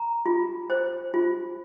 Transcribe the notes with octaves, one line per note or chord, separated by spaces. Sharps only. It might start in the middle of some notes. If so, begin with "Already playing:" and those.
Already playing: A#5
F4
C5
F4